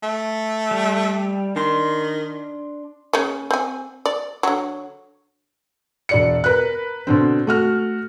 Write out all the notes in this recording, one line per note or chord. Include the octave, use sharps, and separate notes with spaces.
A3
G3
D#3 D4 C6
C#3 A#3 C#4
C4 G#5
D5
D3 F#3
E1 D5 C#7
A#4 B4 F#6
B2 D3 C4
A3 F#4 F6